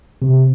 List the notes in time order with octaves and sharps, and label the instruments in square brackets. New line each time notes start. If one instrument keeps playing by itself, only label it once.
[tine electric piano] C3